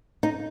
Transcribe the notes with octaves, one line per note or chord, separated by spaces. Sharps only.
D#4